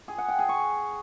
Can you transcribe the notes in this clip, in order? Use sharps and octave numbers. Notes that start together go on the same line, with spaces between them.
G#4
F#5
G5
G#4
C#6